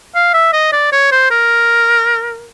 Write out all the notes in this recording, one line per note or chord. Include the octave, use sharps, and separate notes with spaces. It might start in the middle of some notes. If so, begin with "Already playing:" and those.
F5
E5
D#5
D5
C#5
C5
A#4